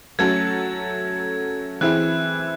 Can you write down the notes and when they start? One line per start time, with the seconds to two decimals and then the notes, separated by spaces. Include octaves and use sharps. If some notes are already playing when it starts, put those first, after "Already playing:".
0.19 F#3 A3 C#4 F#4 A4 G#6
1.81 E3 C4 E4 G#4 F#6